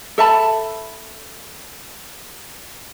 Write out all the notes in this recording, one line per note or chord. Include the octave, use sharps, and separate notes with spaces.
A4 E5 A5 B5